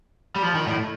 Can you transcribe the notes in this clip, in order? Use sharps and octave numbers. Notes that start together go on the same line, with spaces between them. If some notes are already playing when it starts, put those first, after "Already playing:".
G3
F3
D#3
A2